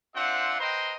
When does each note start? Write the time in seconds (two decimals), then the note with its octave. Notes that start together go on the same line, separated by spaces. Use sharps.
0.15 C4 D4 F4 C5 E5 F#5
0.60 B4 C5 D#5 G5 A#5 C6